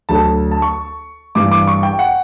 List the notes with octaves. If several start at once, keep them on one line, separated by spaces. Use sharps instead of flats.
D2 D3 F#3 A3 A5
A5
C#6
G2 E3 G3 D6
D6
C#6
G5
F#5